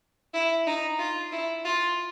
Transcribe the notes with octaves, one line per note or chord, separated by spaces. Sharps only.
E4
D#4
F4
E4
F4